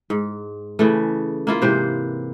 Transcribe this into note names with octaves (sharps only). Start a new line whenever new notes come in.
G#2
C#3 E3 A3
A#3 E4 F4
G#2 C3 E3 C5